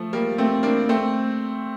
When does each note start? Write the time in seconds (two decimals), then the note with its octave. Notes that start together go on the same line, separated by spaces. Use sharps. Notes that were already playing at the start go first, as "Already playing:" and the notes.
Already playing: F3 A3
0.13 G3 A#3
0.38 A3 C4
0.63 A#3 D4
0.89 A3 C4